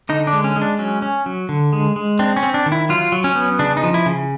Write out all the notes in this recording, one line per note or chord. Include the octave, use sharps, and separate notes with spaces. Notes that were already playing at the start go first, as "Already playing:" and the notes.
D3 D#4
D4
G#3
C#4
G#3
D4
F#3 C#4
C#4
F#3
D3
G#3
G#3
C4 D4
C#4
C4
D4
D#3
E4
F#3 F4
F#3
C#4
B3
C#3 D4
D#4
F3
E4
C#3